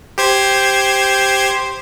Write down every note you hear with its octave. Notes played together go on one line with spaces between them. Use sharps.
G4 C5 G#6